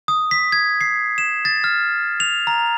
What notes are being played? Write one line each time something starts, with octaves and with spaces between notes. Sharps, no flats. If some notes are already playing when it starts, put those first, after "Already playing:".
D#6
B6
G#6
C7
E7
A6
F6
F7
A#5